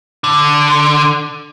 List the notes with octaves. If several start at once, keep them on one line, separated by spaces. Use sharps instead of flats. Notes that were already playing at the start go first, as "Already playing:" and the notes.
D3